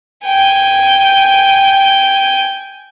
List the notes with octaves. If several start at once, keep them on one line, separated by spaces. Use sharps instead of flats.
G5 G#5